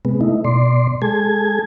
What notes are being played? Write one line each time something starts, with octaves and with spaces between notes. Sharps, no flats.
C3 G#3 B3
A3 D#4 E4
B2 D5 C6
G#3 G#4 A4 G#6